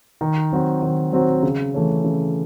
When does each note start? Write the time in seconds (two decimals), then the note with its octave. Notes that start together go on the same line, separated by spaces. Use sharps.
0.21 D#3
0.52 F#3 C4 F#4 C5
0.82 D#3
1.13 F#3 C4 F#4 C5
1.43 C#3
1.74 E3 A3 C#4
2.04 C#3